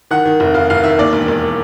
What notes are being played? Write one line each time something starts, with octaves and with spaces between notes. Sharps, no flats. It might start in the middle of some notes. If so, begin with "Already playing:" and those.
D#3 F#5
D#3
F1
F1 F5
F1 F5
D#3 E5
D#2 D5
E1
E1